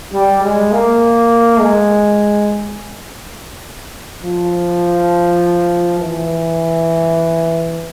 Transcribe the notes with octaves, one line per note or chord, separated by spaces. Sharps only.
G3
G#3
A#3
G#3
F3
E3